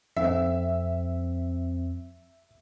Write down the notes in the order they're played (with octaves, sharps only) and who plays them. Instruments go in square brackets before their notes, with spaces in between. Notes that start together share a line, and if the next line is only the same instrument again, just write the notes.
[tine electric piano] F2 C4 [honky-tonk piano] E5